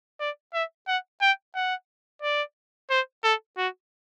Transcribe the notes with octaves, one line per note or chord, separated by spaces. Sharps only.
D5
E5
F#5
G5
F#5
D5
C5
A4
F#4